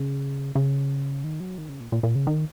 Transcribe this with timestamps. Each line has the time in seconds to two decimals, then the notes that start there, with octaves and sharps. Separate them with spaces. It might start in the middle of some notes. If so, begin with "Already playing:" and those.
Already playing: C#3
0.55 C#3
1.24 D#3
1.40 F#3
1.58 D#3
1.69 C#3
1.80 A#2
1.92 A#2
2.03 A#2
2.15 C#3
2.27 D#3